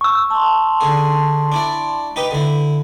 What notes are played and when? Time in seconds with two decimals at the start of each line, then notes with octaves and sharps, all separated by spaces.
0.01 C#6 E6
0.30 A5 C6
0.81 D3 G#4
1.52 D4 E4 D5
2.16 D#4 G4 B4
2.31 D3 E4